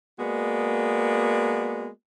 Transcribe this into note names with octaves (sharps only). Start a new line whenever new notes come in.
G#3 A#3 B3 F#4 D5